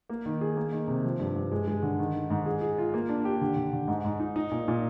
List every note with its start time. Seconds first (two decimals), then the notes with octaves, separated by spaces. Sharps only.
0.09 A#3
0.26 D#3
0.41 G#4
0.57 A#3
0.72 D#3
0.88 C3
1.04 F3
1.19 G2
1.36 G2
1.51 G#3
1.67 G#3
1.83 D3
1.99 D#3
2.15 D#3
2.30 G#2
2.46 G#4
2.61 G#4
2.78 F4
2.94 A#3
3.09 D4
3.25 G4
3.41 D3
3.56 D3
3.73 D3
3.88 G#2
4.05 G#2
4.20 D#4
4.36 D#4
4.51 A#2
4.68 A#2